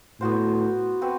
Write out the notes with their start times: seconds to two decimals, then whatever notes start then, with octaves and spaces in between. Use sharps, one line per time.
0.21 A2 B3 F#4 C5
1.01 C4 F#4 B4